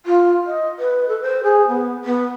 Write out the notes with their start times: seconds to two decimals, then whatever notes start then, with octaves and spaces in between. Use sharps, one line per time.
0.06 F4
0.47 D#5
0.79 B4
1.09 A4
1.22 C5
1.44 G#4
1.68 B3
2.05 B3